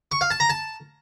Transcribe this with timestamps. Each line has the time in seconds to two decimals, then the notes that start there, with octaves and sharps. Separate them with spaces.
0.12 C#6
0.21 F5
0.31 A5
0.40 A#5
0.50 A5